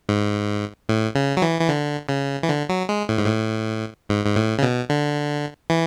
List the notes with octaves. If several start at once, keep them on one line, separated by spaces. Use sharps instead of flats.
G#2
A2
C#3
F#3
E3
E3
D3
C#3
E3
D3
F#3
G#3
A2
G#2
A2
G#2
G#2
A2
C#3
B2
D3
E3